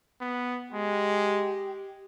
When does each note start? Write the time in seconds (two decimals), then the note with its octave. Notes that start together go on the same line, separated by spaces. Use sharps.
0.21 B3
0.73 G#3 G4